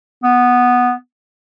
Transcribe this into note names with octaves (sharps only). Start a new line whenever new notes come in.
B3